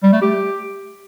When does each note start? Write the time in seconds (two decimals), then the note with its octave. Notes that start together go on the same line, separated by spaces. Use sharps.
0.03 G3
0.13 A3
0.22 G4